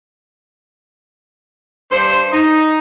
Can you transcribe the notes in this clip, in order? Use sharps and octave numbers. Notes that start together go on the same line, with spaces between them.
G2 C5
D#4